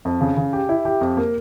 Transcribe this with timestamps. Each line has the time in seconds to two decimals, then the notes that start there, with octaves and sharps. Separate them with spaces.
0.05 F2
0.21 C#3
0.37 C#3
0.53 G4
0.69 E4
0.85 G4
1.01 F2
1.17 A#3